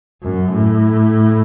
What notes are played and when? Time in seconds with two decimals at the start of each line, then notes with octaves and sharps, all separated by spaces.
0.22 F#2
0.52 A2